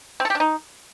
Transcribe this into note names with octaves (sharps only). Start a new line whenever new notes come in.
C4
A4
G4
D4
D#4